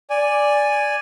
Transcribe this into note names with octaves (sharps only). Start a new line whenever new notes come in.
D5 G#5